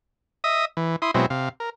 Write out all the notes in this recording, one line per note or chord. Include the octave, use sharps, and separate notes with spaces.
D#5 E5 D#6
E3
E4 C6 D#6
B2 F#3 G#3 C4 E4
C3 F5
A#4